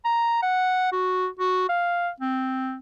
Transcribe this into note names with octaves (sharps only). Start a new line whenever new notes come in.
A#5
F#5
F#4
F#4
F5
C4